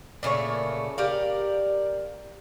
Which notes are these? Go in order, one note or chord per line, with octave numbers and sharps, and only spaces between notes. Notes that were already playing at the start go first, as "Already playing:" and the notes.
A#2 C#3 A3 C#5
G4 A#4 D5 F5